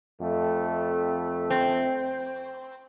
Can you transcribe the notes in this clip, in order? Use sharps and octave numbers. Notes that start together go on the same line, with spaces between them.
F2 A3
C4